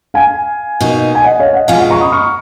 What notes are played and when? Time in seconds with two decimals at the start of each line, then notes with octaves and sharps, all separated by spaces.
0.14 F5 G#5
0.80 B2 A#3 D#4
1.15 G#5
1.24 D#5 F#5
1.40 C#5 F5
1.53 D#5 F#5
1.68 B2 G#3 C#4 F4 F5 G#5
1.79 D#5 F#5
1.90 A#5 C#6
2.01 B5 D#6
2.12 C#6 F6